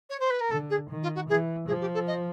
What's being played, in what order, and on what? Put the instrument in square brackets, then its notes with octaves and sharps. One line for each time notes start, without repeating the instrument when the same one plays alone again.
[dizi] C#5
C5
B4
A#4
[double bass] D3 [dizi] A4
[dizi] G#4
[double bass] D#3
[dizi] F4
F#4
[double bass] E3 [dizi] G#4
[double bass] F3 [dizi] G#4
[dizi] G4
A4
D#5